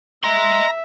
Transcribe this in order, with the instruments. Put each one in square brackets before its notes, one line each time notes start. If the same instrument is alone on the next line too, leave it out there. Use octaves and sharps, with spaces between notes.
[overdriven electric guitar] D#5 C6 [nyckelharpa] E5 [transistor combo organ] A#5